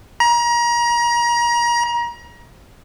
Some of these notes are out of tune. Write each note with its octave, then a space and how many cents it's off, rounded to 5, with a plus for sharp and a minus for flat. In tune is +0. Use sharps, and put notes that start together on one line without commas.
A#5 +30